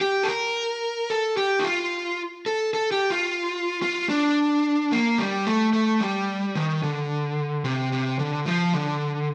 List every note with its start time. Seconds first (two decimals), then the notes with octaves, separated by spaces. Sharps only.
0.01 G4
0.23 A4
0.28 A#4
1.10 A4
1.37 G4
1.59 D#4
1.64 F4
2.46 A4
2.74 A4
2.92 G4
3.10 F4
3.82 F4
4.09 D4
4.92 A#3
5.18 G3
5.47 A3
5.73 A3
6.00 G3
6.55 D#3
6.83 D3
7.65 C3
7.92 C3
8.19 D3
8.46 F3
8.74 D3